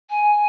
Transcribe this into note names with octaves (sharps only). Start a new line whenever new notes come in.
G#5